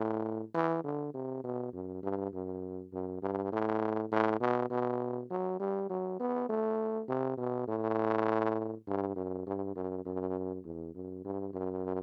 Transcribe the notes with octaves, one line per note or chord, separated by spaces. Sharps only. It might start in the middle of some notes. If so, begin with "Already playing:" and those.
Already playing: A2
E3
D3
C3
B2
F#2
G2
F#2
F#2
G2
A2
A2
B2
B2
F#3
G3
F#3
B3
A3
C3
B2
A2
G2
F#2
G2
F#2
F#2
E2
F#2
G2
F#2